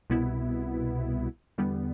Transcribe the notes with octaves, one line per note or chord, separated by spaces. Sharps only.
C2 B2 B3 E4
E2 D3 G3 B3